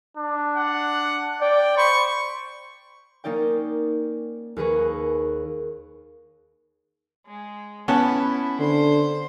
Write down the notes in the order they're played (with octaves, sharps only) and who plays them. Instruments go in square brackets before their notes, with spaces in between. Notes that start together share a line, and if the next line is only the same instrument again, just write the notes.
[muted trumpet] D4
[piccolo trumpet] F#5
[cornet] D5 [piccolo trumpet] G5
[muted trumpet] C5 [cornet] B5 [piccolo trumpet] C#6
[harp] A#3 C#4 D#4 D5 G5
D#2 D#3 G#4 B4 C#6
[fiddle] G#3
[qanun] B3 [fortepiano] C#4 F#5 A5 [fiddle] E4
[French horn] D3 [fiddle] C5